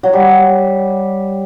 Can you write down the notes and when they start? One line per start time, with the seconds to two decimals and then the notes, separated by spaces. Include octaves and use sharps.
0.03 F#3
0.13 G3